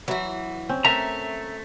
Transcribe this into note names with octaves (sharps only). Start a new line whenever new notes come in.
E3 F#3 F#4 E5
C4 C#4
A3 A#4 E5 A#5